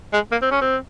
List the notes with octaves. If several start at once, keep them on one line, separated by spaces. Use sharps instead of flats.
G#3
A#3
C4
C#4
C4